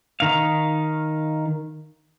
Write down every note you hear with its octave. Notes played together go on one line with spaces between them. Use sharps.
D#3 F5